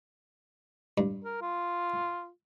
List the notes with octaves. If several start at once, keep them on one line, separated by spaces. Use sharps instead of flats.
G2
A#4
F4